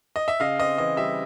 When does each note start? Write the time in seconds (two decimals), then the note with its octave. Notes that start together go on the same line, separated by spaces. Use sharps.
0.16 D#5
0.28 E5
0.40 C#3 D#5 F5
0.59 C4 D#5
0.78 E3 D#5
0.97 G3 E5